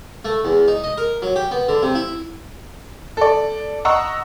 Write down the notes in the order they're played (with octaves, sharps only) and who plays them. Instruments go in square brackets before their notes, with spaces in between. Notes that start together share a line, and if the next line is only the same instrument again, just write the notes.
[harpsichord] A3
E2
D#4
D#5
A#4
F#3
G4
B3
D3
C3
E4
[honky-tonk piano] A4 D5
D#5 F#5 A#5 C#6 E6